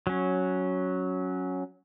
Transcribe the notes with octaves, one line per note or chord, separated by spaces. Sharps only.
F#3 C#4